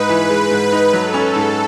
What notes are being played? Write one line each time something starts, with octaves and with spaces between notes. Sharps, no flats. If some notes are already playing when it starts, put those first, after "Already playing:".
Already playing: G#2 G#3 D#4 B4
E3
G#3
G#2
D#4
F#3 A4
C#4
G#2